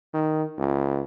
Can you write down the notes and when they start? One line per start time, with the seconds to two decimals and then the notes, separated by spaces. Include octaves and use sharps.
0.14 D#3
0.58 C#2